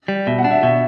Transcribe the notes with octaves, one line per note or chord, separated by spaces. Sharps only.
G3
B2 E5
F#5
D4
E5
B2 E5